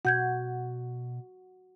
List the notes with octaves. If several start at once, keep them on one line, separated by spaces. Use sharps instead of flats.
B2 F#4 F#5 G6 G#6